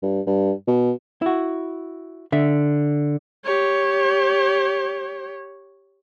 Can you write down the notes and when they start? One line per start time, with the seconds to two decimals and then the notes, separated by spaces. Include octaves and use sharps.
0.02 G2
0.26 G2
0.67 B2
1.22 E4 F#4
2.32 D3 E5
3.44 G4 C#5